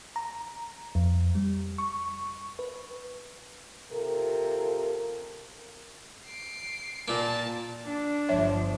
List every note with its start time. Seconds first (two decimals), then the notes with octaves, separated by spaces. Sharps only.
0.16 A#5
0.95 F2
1.35 G3
1.78 C#6
2.59 B4
3.92 C3 F4 A4 A#4
6.26 C7 D7
7.08 A#2 A#3 A5
7.85 D4
8.29 G1 F3 C#5 E5